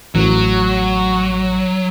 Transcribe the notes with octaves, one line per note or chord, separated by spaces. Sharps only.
A1 F#3